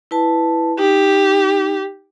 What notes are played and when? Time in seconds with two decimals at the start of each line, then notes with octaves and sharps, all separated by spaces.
0.11 E4 B4 A5
0.79 D#4 G4